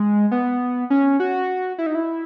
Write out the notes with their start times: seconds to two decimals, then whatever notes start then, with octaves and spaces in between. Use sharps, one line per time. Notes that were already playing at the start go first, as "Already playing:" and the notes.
Already playing: G#3
0.31 B3
0.90 C#4
1.20 F#4
1.78 E4
1.86 D#4
1.95 E4